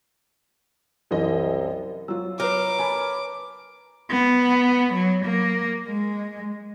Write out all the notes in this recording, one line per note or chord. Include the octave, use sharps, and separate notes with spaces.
C2 F#2 E3 D#5
F#3 F4 E6
A#4 B4 C#5 D6
G#5 A5 B5
B3
F#3
A#3
G#3